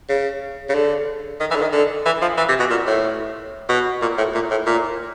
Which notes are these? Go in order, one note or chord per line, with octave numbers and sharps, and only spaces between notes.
C#3
C#3
D3
D#3
E3
D3
D#3
D3
E3
F3
E3
C3
B2
A#2
A2
B2
A#2
A2
A#2
A2
A#2